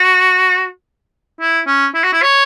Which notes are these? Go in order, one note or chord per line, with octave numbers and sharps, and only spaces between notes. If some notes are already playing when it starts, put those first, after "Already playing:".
Already playing: F#4
E4
C#4
E4
F#4
E4
C#5